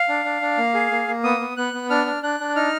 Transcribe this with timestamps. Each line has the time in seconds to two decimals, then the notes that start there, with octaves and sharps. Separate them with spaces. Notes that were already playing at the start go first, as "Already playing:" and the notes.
Already playing: F5
0.09 D4
0.25 D4
0.41 D4
0.58 A#3
0.74 G#4
0.91 A#3
1.07 A#3
1.24 B3 D#6
1.40 B3
1.57 B3 F#6
1.74 B3
1.90 D4 F6
2.06 D4
2.23 D4 F#6
2.40 D4
2.56 D#4 F6